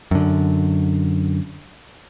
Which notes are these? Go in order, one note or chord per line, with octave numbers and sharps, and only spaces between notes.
F#2 D3